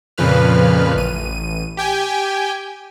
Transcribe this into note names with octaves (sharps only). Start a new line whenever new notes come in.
F2 A#2 C#3 F3 B4 F6
A1 D#7
G4 G5 G#5